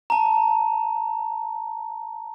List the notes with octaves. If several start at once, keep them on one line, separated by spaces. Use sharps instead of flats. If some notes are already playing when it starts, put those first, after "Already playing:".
A5 A#5